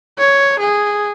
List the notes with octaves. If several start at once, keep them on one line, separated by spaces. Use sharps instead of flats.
C#5
G#4